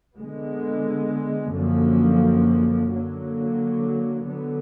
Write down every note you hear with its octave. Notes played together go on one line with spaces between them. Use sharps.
D3 G#3 B3
F#2 D3 F3 A#3
D3 F#3 A#3
D3 F#3 B3